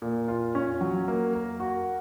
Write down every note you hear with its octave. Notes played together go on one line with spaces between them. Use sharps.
A#2
F4
C#4
F#3
A#3
A#4
F#4